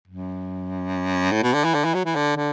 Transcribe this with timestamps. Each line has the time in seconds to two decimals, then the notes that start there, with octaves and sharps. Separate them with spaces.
0.08 F#2
1.32 A2
1.43 B2
1.54 D3
1.64 E3
1.75 D3
1.85 E3
1.94 F#3
2.05 E3
2.16 D3
2.36 D3